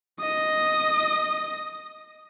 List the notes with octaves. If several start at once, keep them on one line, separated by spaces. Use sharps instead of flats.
D#5 D#6